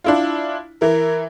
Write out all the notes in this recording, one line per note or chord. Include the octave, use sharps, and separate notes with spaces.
D4 E4 F4
E3 A#4